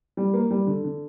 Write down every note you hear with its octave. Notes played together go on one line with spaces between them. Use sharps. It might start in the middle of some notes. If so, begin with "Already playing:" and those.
G3
A#3
G3
D3
D3